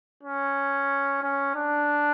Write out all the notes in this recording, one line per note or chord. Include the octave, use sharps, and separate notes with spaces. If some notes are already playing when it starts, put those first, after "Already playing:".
C#4
C#4
D4